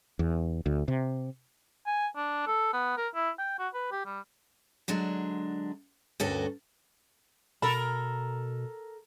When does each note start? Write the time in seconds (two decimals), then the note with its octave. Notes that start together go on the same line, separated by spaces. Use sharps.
0.19 E2
0.66 D2
0.88 C3
1.86 G#5
2.16 D4
2.47 A4
2.73 B3
2.97 A#4
3.15 E4
3.39 G5
3.59 F#4
3.74 B4
3.92 G4
4.05 G3
4.88 D3 F#3 G#3 D4
6.20 D2 G2 C#4 F#4 A4 A#4
7.62 B2 A4 A#4 B5